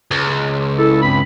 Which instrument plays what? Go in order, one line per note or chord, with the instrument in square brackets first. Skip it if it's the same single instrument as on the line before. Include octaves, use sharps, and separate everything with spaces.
[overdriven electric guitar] C#2
[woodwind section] E4 A4
G2 C4 B5